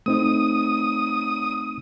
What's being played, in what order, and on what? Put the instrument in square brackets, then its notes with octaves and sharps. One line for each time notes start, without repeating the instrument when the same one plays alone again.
[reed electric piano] A3 C4 D#4 [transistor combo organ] D#6